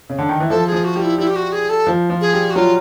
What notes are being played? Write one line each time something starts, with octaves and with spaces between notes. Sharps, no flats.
C#3
D3
D#3
E3
F3 A4
G#4
F3
F#4
G3
E4
G3 E4
G4
F#4
G#4
A4
F3
F3
G#4
G3
F#4
F#3 F4